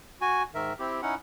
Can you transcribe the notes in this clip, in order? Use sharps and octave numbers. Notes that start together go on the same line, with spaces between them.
F#4 G#5
G#2 D#3 A#4 E5
C4 E4 G4
C#4 D#4 E4 F#5